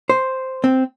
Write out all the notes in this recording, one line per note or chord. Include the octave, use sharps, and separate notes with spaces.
C5
C4